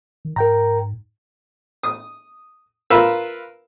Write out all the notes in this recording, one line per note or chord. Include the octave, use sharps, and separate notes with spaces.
D#3
G#2 A#4 G5 A#5
D#6
F4 A#4 B4 E5 E6